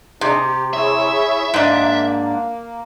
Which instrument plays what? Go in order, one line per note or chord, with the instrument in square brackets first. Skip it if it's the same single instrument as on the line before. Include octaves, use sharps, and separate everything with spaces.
[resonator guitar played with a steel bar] C3 [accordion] D4 D#4 G#4
[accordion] G4
[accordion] E4 G#4 C#5 [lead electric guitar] E5
[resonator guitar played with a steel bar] G#2 D4 [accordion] A#3